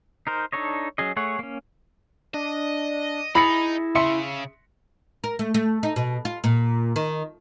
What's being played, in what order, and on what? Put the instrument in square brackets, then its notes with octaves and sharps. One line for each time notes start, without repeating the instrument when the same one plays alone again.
[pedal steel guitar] D#4 A#4 C5
D4 D#4 A4 C#5 D#5
F#3 C#4 G#4 D#5
A3 G#4 C#5 F#5
A#3 C#4
[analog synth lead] D4 [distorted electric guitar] D#5
[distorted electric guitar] D#4 [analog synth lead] E4 [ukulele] G#4 B5 [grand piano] A6 A#6 C#7
[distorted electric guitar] C#3 [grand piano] E5 C6 C#7
[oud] A#4
A3
A3
D#4
B2
F4
A#2
D#3